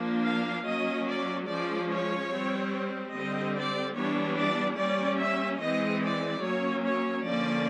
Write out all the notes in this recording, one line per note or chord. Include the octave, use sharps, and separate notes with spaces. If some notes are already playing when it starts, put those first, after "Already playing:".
Already playing: F3 A#3 D4
F5
F#3 A#3 C#4 D#5
D5
F3 G#3 C#4 D5
C#5
G3 C4
D3 G3 C4 D#5
D5
E3 G3 B3 D4 C#5
D5
G3 A#3 C#4 D5
E5
E3 G#3 C4 D#5
D5
F#3 A#3 C#4 C#5
C#5
D3 F3 A#3 C#4 D5